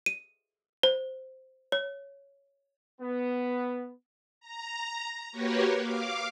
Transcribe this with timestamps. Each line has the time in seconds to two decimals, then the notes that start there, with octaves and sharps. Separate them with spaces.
0.06 D#7
0.83 C5
1.72 C#5
3.01 B3
4.40 A#5
5.32 A#3 F#4 G4 A#4 B4 C#5
5.79 F5 D6